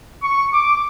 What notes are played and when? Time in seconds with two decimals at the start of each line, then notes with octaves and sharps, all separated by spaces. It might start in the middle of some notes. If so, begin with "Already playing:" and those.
0.23 C#6
0.53 D6